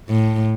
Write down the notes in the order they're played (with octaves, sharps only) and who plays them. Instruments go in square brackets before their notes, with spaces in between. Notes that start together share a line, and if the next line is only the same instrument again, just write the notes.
[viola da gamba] A2